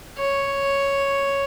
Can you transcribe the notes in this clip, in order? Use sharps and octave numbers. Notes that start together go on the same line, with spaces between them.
C#5